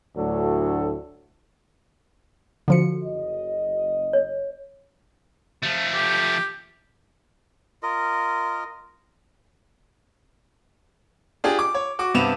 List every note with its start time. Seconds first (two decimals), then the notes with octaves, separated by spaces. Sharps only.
0.16 D2 A2 F#3 D4 A4
2.68 D3 F3 F#4 A4 C#7
3.03 F#1 D#5
4.13 C#5
5.63 F3 A3
5.95 G4
7.83 F4 A#4 D#5
11.44 D4 F4 G4 G#4
11.59 D6
11.75 C#5
11.99 F#4 C#6 D6
12.15 G2 C3 B3 E7 F7